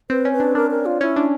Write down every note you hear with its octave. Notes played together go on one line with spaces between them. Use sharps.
C4 B4
C#4
B4
D4
D4 A#4
A#4
F4
C#4 E4
D4